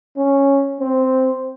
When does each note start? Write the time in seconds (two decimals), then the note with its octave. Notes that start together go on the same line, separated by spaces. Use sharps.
0.17 C#4
0.80 C4